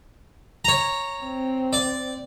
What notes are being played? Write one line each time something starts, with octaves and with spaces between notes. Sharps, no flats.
C#5 A#5
C4
D5